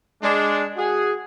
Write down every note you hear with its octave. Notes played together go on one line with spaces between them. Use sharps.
G#3 D4
F#4 G#4